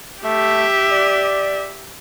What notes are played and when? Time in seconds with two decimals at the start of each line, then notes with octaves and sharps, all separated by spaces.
0.24 A3 G4 E5
0.91 D5